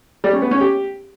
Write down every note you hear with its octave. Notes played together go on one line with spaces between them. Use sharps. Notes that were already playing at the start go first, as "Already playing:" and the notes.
G3
C#4
B3
C#4
G4